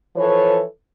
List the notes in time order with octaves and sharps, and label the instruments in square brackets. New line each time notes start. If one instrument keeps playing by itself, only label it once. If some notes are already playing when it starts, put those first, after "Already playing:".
[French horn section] E3 F3 A4 B4 C#5